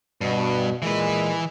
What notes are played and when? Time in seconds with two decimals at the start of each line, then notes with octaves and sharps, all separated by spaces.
0.21 G2 B2
0.82 A#2 E3 G#3 B4